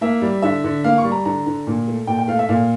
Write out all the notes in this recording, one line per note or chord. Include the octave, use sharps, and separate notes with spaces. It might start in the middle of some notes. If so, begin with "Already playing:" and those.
A#3 E5
G3
D3 E5
D3
A#3 F5
C#6
G3
A#5
D3 A#5
D3
A#2
A3
A#2 G5
G5
A3 F5
E5
A#2 F5